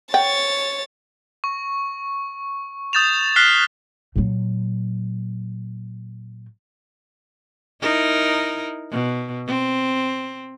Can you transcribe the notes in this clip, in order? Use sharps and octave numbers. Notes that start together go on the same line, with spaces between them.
C#5 F#5 G5 A6
C#6
D#6 G6 A6 E7 F7
F6 F#6 B6 C7 G7
A#2 F#3
D#4 E4 A#4
B2
C4